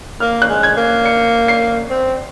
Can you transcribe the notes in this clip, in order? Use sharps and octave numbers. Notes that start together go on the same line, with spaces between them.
A#3 F6
F#6
G#3
G#6
A#3
C#7
C7
C4